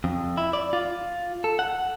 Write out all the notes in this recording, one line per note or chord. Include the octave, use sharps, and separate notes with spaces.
F2
E4
D5
F4
A4
F#5